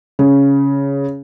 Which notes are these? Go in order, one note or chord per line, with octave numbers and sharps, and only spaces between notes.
C#3